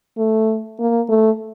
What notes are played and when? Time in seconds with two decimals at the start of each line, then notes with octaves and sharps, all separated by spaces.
0.18 A3
0.79 A#3
1.09 A3